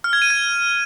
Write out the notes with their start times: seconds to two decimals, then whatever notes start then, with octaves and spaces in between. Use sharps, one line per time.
0.04 F6
0.13 G#6
0.22 D#7
0.30 G#6